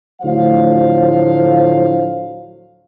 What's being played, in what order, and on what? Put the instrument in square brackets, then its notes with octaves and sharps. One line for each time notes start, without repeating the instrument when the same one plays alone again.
[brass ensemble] D2 A2 F3 F#3 C5 F5